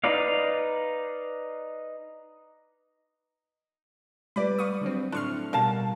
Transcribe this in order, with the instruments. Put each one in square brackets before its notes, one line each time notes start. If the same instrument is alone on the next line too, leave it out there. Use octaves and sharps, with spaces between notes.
[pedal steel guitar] D#4 B4 D5 F5
[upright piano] G3 B4 D5 [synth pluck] B5 D6
[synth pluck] F5 C#6 D#6
D3 F#3 C4
[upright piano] A2 [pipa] D4 [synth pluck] C6 C#6 F6
[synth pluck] B2 G3 [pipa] A#4 F5 A5